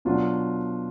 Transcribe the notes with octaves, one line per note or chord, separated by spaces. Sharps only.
B2 F#3 D4 F4